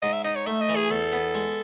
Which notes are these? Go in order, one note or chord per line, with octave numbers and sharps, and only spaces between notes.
G#2 D#5
E5
D#4 D#5
C#5
A3 E5
D#5
E3
G#4
E2 A4
B3
G#3